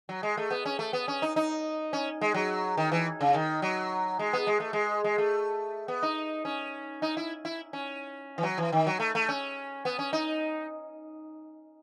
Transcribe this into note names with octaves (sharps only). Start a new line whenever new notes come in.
F#3
G#3
A3
B3
C#4
A3
B3
C#4
D#4
D#4
C#4
G#3
F#3
D#3
E3
C#3
D#3
F#3
G#3
B3
G#3
A3
G#3
G#3
A3
B3
D#4
C#4
D#4
E4
E4
C#4
E3
F#3
E3
D#3
F#3
A3
A3
C#4
B3
C#4
D#4